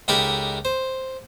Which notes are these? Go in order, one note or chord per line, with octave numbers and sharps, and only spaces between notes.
C#2 D#4 G4 A4 A#4 B5
C5